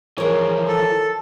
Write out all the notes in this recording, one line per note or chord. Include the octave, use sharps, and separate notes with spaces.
E3 F3 G#4 A#4 C#5
A4